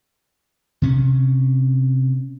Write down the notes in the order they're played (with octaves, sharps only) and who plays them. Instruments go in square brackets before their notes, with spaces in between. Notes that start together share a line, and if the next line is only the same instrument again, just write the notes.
[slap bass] C3 C#4